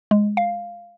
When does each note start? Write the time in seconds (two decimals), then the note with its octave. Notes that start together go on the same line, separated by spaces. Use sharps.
0.11 G#3
0.37 F5